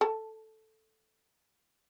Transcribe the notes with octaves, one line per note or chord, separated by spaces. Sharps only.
A4 A5